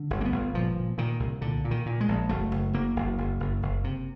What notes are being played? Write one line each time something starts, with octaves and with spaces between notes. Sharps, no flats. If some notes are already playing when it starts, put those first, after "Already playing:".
Already playing: D3
G1
A#3
B3
G1
A#2 F3
A#2
A#2 D#3
C2
A#2 D3
A#2
D#3
A#2
G#3
A#1
F#1 A3
F#1
F#1 A#3
F#1
F#1
F#1
F#1
C3